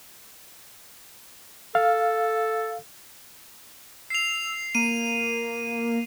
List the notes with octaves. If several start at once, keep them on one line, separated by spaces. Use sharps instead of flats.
A4 F5
E6 C7 F7
A#3 D#7